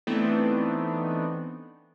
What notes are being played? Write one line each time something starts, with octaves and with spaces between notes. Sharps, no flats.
E3 A3 B3 C4 D4 D#4